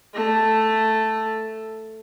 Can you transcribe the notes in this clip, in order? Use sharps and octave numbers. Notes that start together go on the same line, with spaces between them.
A3 A4